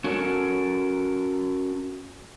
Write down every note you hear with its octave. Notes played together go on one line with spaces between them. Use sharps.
C#4 F#4 A4 A#4